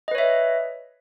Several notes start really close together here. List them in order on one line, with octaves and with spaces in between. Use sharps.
D#5 B4 C#5 E5